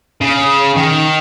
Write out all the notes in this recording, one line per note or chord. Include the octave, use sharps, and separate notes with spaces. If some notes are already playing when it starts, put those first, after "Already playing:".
C#3
D#3